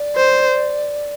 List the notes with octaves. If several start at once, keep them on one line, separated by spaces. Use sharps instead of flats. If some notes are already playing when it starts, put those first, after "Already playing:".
Already playing: D5
C5